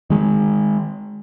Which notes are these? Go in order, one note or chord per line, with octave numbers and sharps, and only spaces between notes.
D#3 G#3